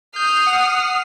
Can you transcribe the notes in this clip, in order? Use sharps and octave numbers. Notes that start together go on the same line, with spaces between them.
D#6 F6 G6 C7
F#5